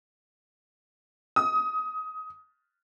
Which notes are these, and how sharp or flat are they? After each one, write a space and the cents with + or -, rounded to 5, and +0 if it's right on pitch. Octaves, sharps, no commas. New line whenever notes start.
D#6 +20